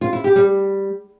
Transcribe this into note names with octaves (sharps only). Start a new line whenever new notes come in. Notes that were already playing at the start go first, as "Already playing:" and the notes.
F4
E4
G4
G3